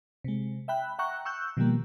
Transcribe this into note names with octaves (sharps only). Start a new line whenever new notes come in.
C3 G#3
E5 G5 B5 F#6
E5 F#5 G5 A#5 C#6 F#6
C#6 E6 F#6 G6
B2 D#3 F3 G3 A#3